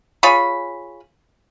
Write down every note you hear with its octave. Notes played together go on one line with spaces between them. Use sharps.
F4 G#4 C#5 B5